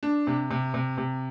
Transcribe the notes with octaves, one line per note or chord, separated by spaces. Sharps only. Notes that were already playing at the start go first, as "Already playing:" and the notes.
D4
C3
C3
C3
C3